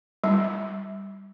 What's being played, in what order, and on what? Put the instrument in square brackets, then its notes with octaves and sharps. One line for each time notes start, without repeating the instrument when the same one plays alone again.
[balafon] G3